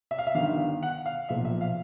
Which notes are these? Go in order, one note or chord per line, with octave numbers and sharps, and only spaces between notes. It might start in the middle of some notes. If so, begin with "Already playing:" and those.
E5
F5
E5
G1 G2 D#3 F5
F#5
F5
B1 A#2 F3 E5
E5
F5